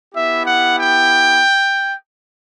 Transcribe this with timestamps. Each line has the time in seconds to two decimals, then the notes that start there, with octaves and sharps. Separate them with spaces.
0.14 B3 E4 G4 E5
0.46 F#5
0.79 G5